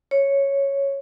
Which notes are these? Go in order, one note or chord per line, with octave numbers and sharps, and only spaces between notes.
C#5